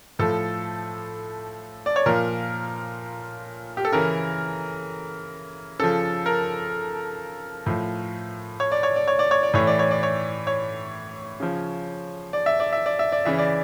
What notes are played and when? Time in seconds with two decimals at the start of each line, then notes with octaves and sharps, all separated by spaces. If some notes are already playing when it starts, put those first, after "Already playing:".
0.19 A2 F3 A4
1.86 D5
1.96 C#5
2.06 A#2 F3 A#4
3.77 G4
3.85 A4
3.92 C#3 E3 A#4
5.80 C#3 F3 A4
6.26 A#4
7.66 A2 F3
8.60 C#5
8.72 D5
8.83 C#5
8.96 D5
9.08 C#5
9.19 D5
9.31 C#5
9.43 D5
9.54 A2 E3 C#5
9.67 D5
9.79 C#5
9.91 D5
10.03 C#5
10.47 C#5
11.40 C#3 F3
12.33 D5
12.46 E5
12.60 D5
12.73 E5
12.86 D5
12.99 E5
13.12 D5
13.25 C#3 E3 E5
13.39 D5